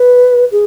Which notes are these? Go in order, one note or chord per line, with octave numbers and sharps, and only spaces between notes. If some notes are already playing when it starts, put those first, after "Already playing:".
Already playing: B4
G#4